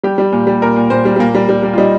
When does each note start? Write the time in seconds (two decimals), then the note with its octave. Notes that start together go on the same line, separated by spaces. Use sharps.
0.04 G3 G4
0.18 G3
0.32 A#2
0.47 G3
0.62 A#2 A#4
0.76 A#2
0.90 A#2 C5
1.05 G3
1.16 G3
1.19 A#2 A#3
1.35 G3
1.49 G3
1.63 G3
1.73 F4
1.78 G3 D#4